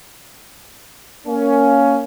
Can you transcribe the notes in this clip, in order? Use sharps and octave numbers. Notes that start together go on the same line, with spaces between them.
A#3 C#4